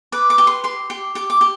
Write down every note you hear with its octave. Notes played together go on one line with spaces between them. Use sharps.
B4 D6
D6
G4
C6
G4 C6
G4
G4 D6
D6
G4